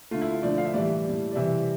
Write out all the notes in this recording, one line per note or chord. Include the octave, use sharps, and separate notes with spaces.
D3 A3 F4
E4
F4
D3 F3 A3 D5
F5
E5
A2 E3 G3 D5
E5
A2 G3
D5
C3 E3 G3 E5